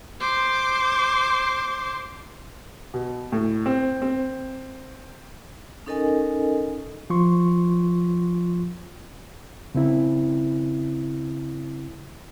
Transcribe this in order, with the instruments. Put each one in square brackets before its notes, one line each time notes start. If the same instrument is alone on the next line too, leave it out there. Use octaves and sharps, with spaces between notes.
[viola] C5 D6
[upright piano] B2
A2
C4
C4
[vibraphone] C#4 D#4 A4 A#4 D#5 G#5
[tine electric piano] F3 F4 C6 C#6
[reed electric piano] C#3 C4 E4